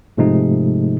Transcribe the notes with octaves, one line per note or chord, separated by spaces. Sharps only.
G#2 C3 F3 G#3 A3 D#4